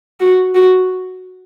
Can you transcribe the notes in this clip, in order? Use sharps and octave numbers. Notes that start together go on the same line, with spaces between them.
F#4
F#4